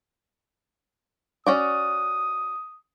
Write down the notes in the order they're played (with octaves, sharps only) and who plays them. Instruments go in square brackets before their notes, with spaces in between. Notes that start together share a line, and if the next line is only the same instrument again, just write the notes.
[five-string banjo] C#4 F#4 D5 [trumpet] D#6